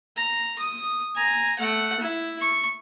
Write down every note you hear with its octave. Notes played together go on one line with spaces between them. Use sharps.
A#5
D#6
G#5 A#5
A3 F#5
E4
C#6